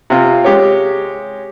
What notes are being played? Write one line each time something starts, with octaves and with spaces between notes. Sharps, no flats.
C3 F4
G#3 G4 C#5